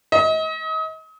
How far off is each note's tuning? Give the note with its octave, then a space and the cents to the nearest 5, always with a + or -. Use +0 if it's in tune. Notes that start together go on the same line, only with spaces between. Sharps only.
D#5 +35